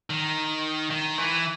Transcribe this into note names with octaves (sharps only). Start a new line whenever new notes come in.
D#3
D#3
E3